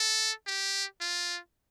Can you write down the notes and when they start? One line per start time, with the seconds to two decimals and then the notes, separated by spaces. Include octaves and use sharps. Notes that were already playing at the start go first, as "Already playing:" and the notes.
Already playing: A4
0.47 G4
1.01 F4